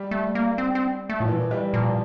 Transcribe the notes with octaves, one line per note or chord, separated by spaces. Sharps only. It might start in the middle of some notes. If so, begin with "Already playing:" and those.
Already playing: G3
A3
A#3
C4
C4
A3
A2 F3
A#2 E3
G3
A#2 F3